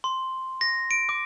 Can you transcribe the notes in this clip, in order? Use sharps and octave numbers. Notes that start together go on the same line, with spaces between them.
C6
A#6
D7
D6